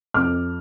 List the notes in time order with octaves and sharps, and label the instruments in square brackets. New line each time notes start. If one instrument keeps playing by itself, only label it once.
[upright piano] F2 D6 F6